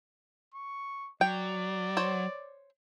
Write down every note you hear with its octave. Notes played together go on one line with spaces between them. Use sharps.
C#6
F#3 D5 G5
C5 C#5